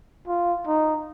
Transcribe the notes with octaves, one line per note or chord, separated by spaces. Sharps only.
F4
D#4